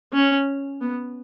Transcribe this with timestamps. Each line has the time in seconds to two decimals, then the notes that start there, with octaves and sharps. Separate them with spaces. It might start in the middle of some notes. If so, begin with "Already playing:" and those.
0.13 C#4
0.81 B3